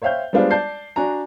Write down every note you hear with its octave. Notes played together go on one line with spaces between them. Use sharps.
C5 C#5 E5 F5 G5 G6
G3 G#3 B3 D4 F4 C5
D5 A5 G6 C7
D4 F#4 G#5 A#5